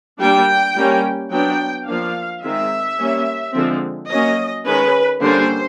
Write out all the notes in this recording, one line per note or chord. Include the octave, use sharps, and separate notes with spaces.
G3 A#3 D4 G5
G3 A#3 C#4
F#3 B3 D4 G5
F3 A#3 D4 F5
D#3 G#3 C4 E5
G3 A#3 C#4
D3 F3 G#3 C4
F#3 A#3 C#4 D#5
D#3 G#3 C#4 B4
D3 G3 A#3 C#4 C5